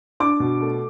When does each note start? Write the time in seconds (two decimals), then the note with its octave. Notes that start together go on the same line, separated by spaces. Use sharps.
0.20 D4 D6
0.40 B2
0.61 A3